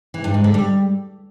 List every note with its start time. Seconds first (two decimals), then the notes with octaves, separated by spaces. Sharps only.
0.14 E3
0.24 G2
0.34 G#2
0.44 D3
0.54 G3